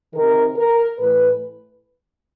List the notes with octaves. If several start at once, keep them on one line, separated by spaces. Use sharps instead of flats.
C3 D#3 A#4
A#4
A2 E3 B4